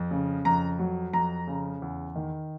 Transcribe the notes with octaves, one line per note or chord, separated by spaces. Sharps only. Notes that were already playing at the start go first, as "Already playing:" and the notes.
Already playing: F2
C#3
F2 A#5
F#3
F2 A#5
C#3
E2
D#3